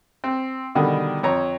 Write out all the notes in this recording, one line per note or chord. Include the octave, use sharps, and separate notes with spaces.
C4
B2 D3 D#3 G3
F2 C#5 A#5